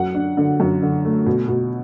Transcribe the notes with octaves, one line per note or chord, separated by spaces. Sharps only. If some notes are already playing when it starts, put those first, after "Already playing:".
Already playing: F#2 F#5
D4
D3
F#2
D3
A3
B2
B2